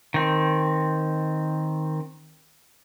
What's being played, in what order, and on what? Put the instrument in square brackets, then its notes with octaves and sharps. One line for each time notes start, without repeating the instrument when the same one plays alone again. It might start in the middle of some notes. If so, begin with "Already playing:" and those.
[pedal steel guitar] D#3 C4